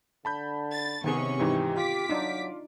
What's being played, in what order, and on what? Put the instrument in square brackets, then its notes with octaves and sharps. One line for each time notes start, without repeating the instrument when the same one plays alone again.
[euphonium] D3 [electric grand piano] A5 B5 G6
[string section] A6
[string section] C3 C#4 C#6 [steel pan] D#3 B3 G#4
[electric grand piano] G#2 E3 D#4 [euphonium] G4
[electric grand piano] F4 [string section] D6 B6
[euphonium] F#3 [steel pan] D4 D#4